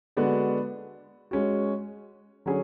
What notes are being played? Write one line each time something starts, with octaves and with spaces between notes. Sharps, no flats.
D3 G#3 B3 D4 F#4
G#3 C#4 F#4
D3 F#3 C#4 G#4